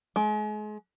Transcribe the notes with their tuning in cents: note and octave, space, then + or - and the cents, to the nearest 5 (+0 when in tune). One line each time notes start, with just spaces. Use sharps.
G#3 +35